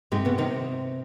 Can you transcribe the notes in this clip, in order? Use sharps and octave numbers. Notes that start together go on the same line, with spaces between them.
G#2 C3 G#3
B2 B3
C3 D#3 D#4